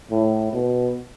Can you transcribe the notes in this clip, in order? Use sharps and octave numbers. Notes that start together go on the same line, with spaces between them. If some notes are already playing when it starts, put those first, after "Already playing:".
A2
B2